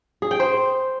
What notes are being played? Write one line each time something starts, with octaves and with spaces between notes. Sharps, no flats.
G#4
G5
C5